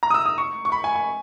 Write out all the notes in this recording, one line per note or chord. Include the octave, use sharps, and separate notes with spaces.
A#5
D#6
E6
D#6
C#6
C#6
B5
G#5
G#5